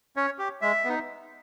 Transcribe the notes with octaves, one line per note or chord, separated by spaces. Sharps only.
C#4 C#5
G4
G#3 E5
B3 D#4